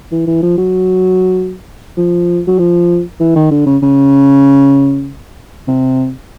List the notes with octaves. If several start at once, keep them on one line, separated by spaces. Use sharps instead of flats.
E3
E3
F3
F#3
F3
F#3
F3
E3
D#3
D3
C#3
C#3
C3